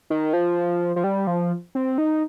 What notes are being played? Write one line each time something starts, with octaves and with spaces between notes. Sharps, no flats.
D#3
F3
F3
G3
F3
C4
D#4